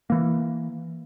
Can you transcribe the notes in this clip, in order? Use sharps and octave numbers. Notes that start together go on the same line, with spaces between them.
E3 A#3